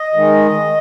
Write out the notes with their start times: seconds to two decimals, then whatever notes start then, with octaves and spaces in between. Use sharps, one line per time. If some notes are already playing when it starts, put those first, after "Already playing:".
Already playing: D#5
0.14 D#3 G#3